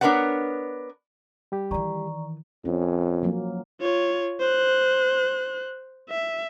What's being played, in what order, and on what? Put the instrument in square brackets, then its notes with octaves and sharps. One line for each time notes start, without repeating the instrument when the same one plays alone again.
[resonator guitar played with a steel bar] B3 D4 A#4 B4 C#5 F#5
[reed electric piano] G3 G4
[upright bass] D#3 E3 [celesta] D5 A#5 C#6
[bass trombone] F2 [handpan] C#4
[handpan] F3 F#3 A#3
[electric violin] F4 C#5
C5 F#6
E5